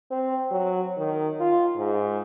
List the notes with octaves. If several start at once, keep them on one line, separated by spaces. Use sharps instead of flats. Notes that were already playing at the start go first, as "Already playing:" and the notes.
C4
F#3
D#3
F4
G#2